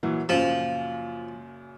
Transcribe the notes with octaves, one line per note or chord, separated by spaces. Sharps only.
A#2 E3 F#3
F#2 A#2 C#3 F3